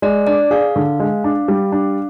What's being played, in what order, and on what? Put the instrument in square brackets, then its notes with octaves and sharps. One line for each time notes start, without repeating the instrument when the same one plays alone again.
[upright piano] G#3 [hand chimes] D5
[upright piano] D4 [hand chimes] D5
[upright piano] G#4 [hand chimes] F5
[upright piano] D3
G#3
D4
G3
D4